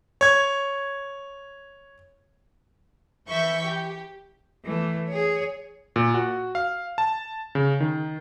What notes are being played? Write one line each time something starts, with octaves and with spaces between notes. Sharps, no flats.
C#5 G#6
E3 E5 C#6 G6 B6
G4
E3 A3
G#4 C#5
A#2
F#4
F5
A5
C#3
D#3